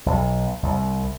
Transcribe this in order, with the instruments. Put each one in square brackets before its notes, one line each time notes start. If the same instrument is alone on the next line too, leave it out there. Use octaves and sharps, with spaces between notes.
[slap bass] B1
C2